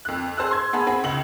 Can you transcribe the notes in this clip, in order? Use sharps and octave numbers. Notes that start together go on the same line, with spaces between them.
F2 F#6
G#4 C5 A5 E6 F#6
C6 G#6
B3 G#4 A5 B5
C4 F#4 G#4 B5
C#2 F#7